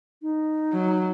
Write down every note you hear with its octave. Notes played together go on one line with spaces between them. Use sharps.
D#4
F#3